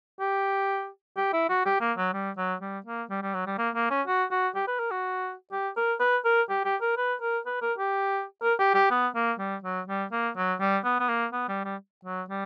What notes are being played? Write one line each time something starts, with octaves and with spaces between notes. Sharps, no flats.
G4
G4
E4
F#4
G4
A#3
F#3
G3
F#3
G3
A#3
G3
G3
F#3
G3
A#3
A#3
C#4
F#4
F#4
G4
B4
A#4
F#4
G4
A#4
B4
A#4
G4
G4
A#4
B4
A#4
B4
A#4
G4
A#4
G4
G4
B3
A#3
G3
F#3
G3
A#3
F#3
G3
B3
B3
A#3
B3
G3
G3
F#3
G3